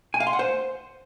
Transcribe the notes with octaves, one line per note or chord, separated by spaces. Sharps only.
G#5
F5
C6
F#5
C5